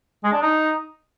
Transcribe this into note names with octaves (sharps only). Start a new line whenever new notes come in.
G#3
D4
D#4